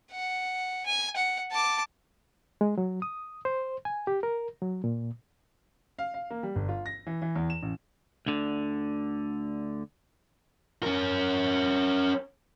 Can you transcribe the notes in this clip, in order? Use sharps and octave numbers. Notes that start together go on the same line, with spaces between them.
F#5
G#5
F#5
A5 D6
G#3
F#3
D#6
C5
G#5
G4
A#4
F#3
A#2
F5
F5
A#3
G3
G1
F4
A#6
E3
E3
E2
E7
A1
D2 D3
C#4 A#4